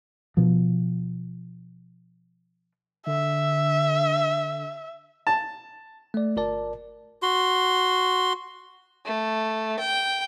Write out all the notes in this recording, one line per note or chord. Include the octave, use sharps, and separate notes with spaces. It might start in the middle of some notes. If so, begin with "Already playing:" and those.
B2 F3
D3 E5
A5
A3 D5
G1 A#4 D5 A5
F#4 C6
A3
G5